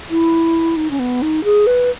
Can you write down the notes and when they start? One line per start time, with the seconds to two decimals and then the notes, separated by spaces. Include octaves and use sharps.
0.10 E4
0.77 D#4
0.91 C#4
0.99 B3
1.22 D#4
1.44 G#4
1.67 B4